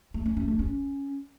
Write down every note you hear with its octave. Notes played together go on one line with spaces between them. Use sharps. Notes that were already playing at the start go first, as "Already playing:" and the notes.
A3
C#4
A3
D4
C#4